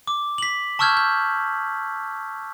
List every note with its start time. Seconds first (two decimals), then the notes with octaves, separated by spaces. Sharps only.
0.07 D6
0.38 B6 F#7
0.79 A5 C#6 E6 F6 G6 G#6
0.97 G6